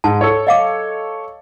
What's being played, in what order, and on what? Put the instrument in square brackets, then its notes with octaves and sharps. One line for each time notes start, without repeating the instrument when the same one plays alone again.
[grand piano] G#2 [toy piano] A5
[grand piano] A4 C#5
[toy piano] D#5 F5 D6